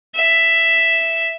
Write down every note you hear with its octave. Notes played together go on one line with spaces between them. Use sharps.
E5